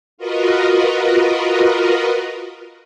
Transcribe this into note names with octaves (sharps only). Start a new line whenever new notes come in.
F4 F#4 A#4 B4 D#5